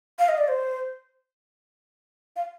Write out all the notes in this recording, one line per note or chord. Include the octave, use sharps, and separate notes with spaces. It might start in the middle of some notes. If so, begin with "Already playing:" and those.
F5
D#5
D5
C5
F5